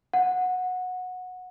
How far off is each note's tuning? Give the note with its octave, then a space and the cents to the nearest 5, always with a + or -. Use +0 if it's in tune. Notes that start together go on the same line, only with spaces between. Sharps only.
F#5 -15